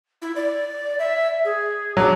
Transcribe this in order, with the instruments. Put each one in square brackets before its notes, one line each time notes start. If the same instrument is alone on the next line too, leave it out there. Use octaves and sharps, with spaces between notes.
[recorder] E4
D5
E5
G#4
[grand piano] F#3 [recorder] D4